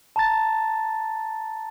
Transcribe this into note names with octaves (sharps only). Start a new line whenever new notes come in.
A5 A#5 A6